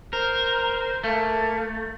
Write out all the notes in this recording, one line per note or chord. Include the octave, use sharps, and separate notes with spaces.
A#4 C5
A3 A#3